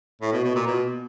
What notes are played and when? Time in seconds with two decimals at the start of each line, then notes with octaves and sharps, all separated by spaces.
0.21 A2
0.33 B2
0.44 B2
0.55 A#2
0.67 B2